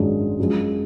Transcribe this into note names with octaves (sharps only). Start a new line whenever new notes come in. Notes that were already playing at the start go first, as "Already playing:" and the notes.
Already playing: G#1 F#2 F3 G#3 D4
F#2 F3 G#3